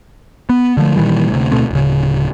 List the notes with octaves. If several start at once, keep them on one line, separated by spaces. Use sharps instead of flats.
B3
D3 F3 A3
A#2 D#3 E3 G3
D2 C3
D2 B2 A3 C4
D1 C#3